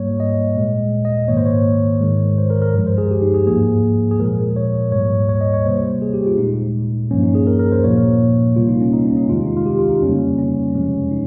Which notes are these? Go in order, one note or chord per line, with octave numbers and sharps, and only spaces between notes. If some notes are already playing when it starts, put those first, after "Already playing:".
Already playing: G#2 G3 A#3 C#5
D#5
A#2 G#3
D#5
G#2 D#3 A#3 C#5
C5
C#5
G#2 D#3 G#3
C5
A#4
A#4
G2 F3 G#3
C5
G#4
G4
D#4
G#4
G#2 F3 A#3 G#4
G#4
A#2 F3 G#3 A#4
C#5
G#2 G3 A#3 C#5
C#5
D#5
C#5
C3 G3 A#3 C5
G#4
G4
F4
A#2 G#3 D#4
G2 F3 A#3 C#4
D#4
G#4
A#4
A#4
C5
A#2 F3 A#3 C#5
C3 G3 A#3 F4
D#4
C#4
D#4
C#4
D#4
F2 C3 D#3 G#3 F4
D#4
F4
G4
F4
D#4
F2 C#3 G3 A#3 C#4
C#4
F2 C3 F3 G#3 C#4
D#4